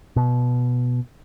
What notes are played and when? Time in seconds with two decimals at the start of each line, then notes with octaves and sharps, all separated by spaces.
0.16 B2